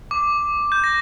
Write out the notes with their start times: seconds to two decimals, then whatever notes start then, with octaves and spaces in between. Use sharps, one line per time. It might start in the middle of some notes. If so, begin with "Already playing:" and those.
0.11 D6
0.72 G6
0.84 A#6